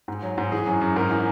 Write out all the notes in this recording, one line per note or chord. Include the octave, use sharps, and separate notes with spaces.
G#2
F#3
G#2
E3 G#4
F#2
F#2
G#2 A#4
E3